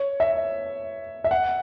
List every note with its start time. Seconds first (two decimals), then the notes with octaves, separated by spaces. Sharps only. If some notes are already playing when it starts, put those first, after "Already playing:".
Already playing: C#5
0.20 E5
1.24 E5
1.31 F#5